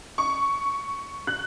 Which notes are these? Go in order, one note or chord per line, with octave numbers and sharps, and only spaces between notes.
C#6
F#6